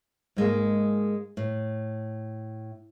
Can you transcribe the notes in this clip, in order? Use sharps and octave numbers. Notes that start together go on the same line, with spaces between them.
G#2 G#3 A#3
A2